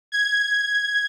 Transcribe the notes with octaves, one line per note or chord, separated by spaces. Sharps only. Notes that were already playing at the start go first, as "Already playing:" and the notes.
G#6